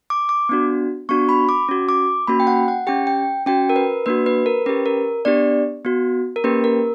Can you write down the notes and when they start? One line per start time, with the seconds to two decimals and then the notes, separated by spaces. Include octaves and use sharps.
0.10 D6
0.29 D6
0.49 B3 D4 F#4
1.09 B3 D4 F#4 C#6
1.29 B5
1.49 D6
1.69 C#4 F#4
1.89 D6
2.27 A#3 C#4 F#4 B5
2.40 G5
2.47 F#5
2.68 F#5
2.87 C#4 G4 G5
3.07 G5
3.46 C#4 F#4 G5
3.69 A#4
3.76 B4
4.06 A#3 D4 F#4 B4
4.26 B4
4.46 A#4
4.66 C#4 G4 B4
4.86 A#4
5.25 B3 D4 G4 D5
5.85 B3 F#4
6.36 A#4
6.44 A#3 C#4 G4 B4
6.64 A#4